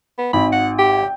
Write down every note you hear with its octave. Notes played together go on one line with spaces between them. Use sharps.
B3
G#1 B5
F#5
G4
G5